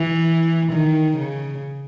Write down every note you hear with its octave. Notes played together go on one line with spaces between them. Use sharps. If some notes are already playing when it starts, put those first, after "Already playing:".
Already playing: E3
D#3
C#3